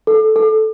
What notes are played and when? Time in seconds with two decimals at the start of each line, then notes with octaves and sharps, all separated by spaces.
0.07 A4
0.36 A4